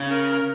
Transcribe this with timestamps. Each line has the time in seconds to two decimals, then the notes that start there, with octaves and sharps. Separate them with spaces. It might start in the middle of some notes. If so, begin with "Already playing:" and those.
Already playing: C#3
0.10 A#4